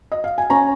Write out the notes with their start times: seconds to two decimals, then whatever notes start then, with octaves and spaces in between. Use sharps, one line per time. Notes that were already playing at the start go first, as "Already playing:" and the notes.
0.12 D#5
0.24 F5
0.38 G#5
0.50 C#4 A#5